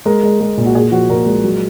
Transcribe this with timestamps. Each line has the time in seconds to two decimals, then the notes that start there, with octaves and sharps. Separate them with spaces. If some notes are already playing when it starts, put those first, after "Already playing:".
0.06 G#3 A#4
0.23 G#3
0.40 G#3
0.57 A#2
0.66 F#4
0.75 A#2 G#4
0.92 F3 F#4
1.09 A#2 A#4
1.26 G#3
1.44 F#3